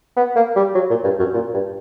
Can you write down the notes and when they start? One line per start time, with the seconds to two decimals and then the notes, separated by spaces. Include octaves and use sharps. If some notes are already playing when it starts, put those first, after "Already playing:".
0.16 B3
0.36 A#3
0.56 G3
0.74 F#3
0.90 A#2
1.04 G2
1.19 F#2
1.34 A#2
1.54 G2